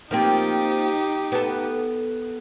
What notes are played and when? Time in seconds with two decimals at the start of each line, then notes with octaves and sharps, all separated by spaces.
0.11 F3 A#3 C4 D#4 G4
1.32 B3 A4